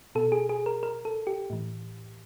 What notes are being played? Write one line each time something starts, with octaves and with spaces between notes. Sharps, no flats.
B2 A4
G#4
G#4
A#4
A#4
A4
G4
A2 E3